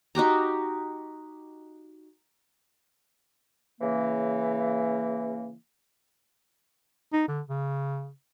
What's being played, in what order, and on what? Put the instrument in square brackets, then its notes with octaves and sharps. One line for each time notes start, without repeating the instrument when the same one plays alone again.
[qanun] D#4 F#4 G4 A#5
[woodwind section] C#3 E3 A#3
[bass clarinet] D#4
D3
C#3